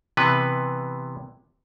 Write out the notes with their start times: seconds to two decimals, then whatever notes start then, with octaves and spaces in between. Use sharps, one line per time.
0.17 C3 E3 B3 B4